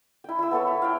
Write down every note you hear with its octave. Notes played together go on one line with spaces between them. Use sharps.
E4 G5
E4 E6
B3 A4 C#5 A5
E5
F5 G5